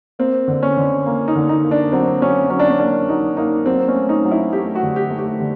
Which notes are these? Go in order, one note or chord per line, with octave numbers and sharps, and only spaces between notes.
A#3 C4
D3
C#4
D3
A#3
D#4
D3
D#4
A#3
D4
F#3 C4
F#3 C#4
F#3 C#4
D4
C#4
A#3 D4
F#3 D#4
A#3 D#4
F#3 C4
C#4
A3
D#4
F#3
E4
A3 G4
F#4
D3
G4
A3
G4
D3